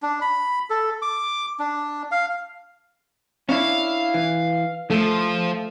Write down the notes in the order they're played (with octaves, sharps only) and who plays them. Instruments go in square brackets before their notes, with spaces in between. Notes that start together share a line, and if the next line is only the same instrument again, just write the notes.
[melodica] D4
B5
A4
D6
D4
F5
[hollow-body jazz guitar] C#4 D4 E4 [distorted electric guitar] F5
[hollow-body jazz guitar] E3
[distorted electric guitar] F3 [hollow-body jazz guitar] A3